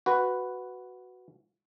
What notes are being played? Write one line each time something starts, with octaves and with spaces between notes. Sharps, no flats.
F#4 B4